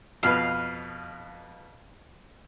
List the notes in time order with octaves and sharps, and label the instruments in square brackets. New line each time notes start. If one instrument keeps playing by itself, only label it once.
[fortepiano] F2 B2 B4 [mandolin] F5